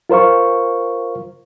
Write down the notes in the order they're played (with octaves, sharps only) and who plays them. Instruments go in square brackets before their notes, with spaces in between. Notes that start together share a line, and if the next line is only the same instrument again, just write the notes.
[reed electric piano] F4 A#4 C5 F5 C#6